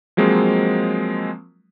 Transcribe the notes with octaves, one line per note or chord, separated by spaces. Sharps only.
F3 F#3 G#3 A#3 C4